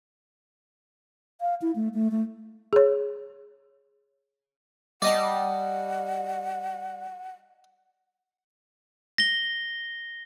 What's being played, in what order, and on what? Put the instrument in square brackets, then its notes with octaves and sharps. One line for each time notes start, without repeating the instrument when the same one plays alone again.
[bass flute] F5
E4
A3
A3
A3
[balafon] G#4 C#5
[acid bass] G3 [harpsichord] D5 D#5 A5 [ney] F#5
[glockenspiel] A#6 G7